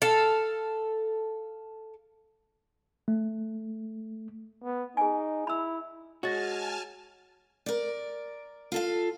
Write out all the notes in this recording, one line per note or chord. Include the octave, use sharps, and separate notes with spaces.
A4 F5
A3
B3
D#4 G#4 G#5
E4 B5 E6
G#3 F#4 C#5 G#5 A5 F6 A6 A#6
A#4 D5
F4 A4 F5